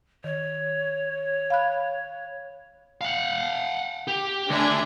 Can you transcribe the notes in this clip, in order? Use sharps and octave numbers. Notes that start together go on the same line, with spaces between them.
D#3 C#5
F5 B5 F#6
F5 F#5
G4
D2 D3 D4 E5 G#5